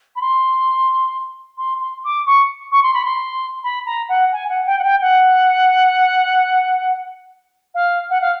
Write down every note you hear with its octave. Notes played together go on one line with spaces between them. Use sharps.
B5
C6
C6
C6
D6
C#6
C#6
C6
B5
C6
B5
A#5
F#5
G#5
F#5
G5
F#5
G5
F#5
F5
F#5
F5